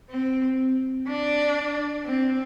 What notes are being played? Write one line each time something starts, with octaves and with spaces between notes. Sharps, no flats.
C4
D4
C4